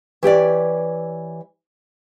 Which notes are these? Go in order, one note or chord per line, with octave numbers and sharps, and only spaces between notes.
E3 G4 C#5 D5